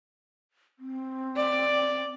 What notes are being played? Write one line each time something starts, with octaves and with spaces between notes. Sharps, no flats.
C4
D5